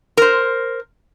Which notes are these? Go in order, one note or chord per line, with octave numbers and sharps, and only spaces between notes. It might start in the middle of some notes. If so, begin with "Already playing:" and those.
A#4 C5